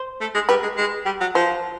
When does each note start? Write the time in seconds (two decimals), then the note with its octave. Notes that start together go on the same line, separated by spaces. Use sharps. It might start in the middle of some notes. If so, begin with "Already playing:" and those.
Already playing: C5
0.21 A3
0.34 G#3
0.49 G3 B4
0.63 G#3
0.77 G#3
1.06 G3
1.20 F#3
1.35 F3 C5